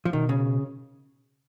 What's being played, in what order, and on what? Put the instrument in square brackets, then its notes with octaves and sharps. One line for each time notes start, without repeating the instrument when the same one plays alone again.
[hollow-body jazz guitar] F3
[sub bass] B2 [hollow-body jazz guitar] D#3
[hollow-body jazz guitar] C#3